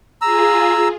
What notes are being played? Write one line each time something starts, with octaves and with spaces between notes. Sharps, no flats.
F4 G#4 A#5 E6